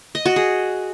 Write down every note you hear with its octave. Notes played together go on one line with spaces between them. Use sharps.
D#5
F#4
G#4